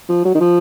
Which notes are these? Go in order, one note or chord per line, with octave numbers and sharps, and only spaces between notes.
F3
F#3
D#3
F3